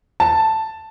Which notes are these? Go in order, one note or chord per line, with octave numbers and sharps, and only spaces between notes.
A5